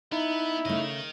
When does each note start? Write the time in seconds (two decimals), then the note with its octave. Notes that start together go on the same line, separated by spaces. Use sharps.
0.12 B3 D#4 E4
0.65 C#3 A3 A#4 D#5